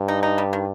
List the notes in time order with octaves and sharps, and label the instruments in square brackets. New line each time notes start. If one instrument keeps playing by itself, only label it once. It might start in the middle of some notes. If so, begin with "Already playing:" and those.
Already playing: [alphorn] G2
[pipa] D#4
D#4
G3
D#3